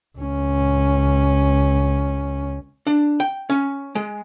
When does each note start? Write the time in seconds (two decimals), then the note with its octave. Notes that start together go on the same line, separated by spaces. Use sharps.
0.18 C#2 C#4
2.87 D4
3.20 G5
3.50 C#4
3.95 G#3